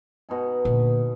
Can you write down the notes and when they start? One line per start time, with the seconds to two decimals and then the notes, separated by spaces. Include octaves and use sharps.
0.29 B2 D#4 G#5
0.65 A#2 D3